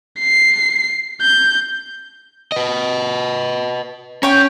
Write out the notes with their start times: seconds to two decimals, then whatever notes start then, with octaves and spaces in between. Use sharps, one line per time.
0.20 C7
1.22 G6
2.52 B4 D#5
4.23 C#4 C#5 G5